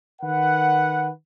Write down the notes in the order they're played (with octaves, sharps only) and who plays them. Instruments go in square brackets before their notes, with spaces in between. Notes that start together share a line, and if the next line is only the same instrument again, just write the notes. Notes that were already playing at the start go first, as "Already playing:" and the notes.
[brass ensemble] D#3 B4 F#5